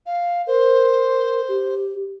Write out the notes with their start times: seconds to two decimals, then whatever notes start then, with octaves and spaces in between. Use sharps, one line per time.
0.06 F5
0.47 A#4 C5
1.48 G4